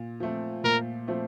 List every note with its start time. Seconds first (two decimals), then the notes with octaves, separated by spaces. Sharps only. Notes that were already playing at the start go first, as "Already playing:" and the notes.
Already playing: A#2
0.20 F3 A3 C4
0.64 A#2 A#4
1.08 F3 A3 C4